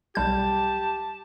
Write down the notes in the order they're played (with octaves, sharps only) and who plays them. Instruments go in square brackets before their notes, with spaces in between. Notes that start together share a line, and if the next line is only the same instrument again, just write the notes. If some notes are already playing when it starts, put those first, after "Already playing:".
[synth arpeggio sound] B1 G3 G6 [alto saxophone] G4 [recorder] A5